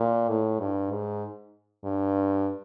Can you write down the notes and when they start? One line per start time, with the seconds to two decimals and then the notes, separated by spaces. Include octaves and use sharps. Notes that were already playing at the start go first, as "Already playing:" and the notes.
Already playing: A#2
0.29 A2
0.60 G2
0.91 G#2
1.84 G2